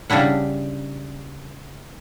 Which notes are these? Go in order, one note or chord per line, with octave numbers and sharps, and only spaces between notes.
C#3 G3 D4 E4 F#5